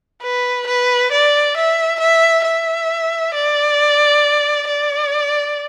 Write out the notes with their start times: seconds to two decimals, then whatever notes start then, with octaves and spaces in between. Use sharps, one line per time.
0.23 B4
0.67 B4
1.11 D5
1.56 E5
2.00 E5
2.44 E5
3.34 D5
4.67 D5